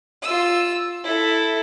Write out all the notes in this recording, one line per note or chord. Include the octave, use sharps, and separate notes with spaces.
F4 E6
E4 A4